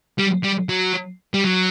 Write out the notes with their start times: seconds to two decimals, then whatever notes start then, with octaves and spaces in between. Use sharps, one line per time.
0.19 G3
0.44 G3
0.69 F#3
1.34 G3
1.44 F#3